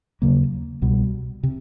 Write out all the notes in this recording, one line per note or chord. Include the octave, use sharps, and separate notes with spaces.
D#2 C#3 F#3 A#3
C2 B2 G3
C3